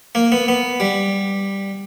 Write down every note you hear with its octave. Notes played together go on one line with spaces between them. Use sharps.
A#3
B3
B3
G3